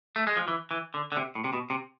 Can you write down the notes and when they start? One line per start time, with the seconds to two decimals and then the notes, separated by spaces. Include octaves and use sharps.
0.16 A3
0.27 G#3
0.37 F3
0.48 E3
0.71 E3
0.94 D3
1.12 D3
1.17 C3
1.35 A2
1.44 C3
1.53 B2
1.70 C3